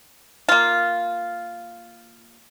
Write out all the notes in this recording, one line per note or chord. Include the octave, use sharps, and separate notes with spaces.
A#3 F4